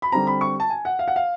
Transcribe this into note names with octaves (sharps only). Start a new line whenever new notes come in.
B5
D3 G3 C4 A#5
B5
C#6
A5
G#5
F#5
F5
F#5
F5